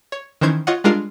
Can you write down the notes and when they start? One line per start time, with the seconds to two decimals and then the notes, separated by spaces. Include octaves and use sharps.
0.12 C#5
0.41 D#3 E3 C#4 C5 G6 G#6
0.67 F4 C#5 D#5 F#5
0.84 G3 G#3 D4 F4 A#4 F5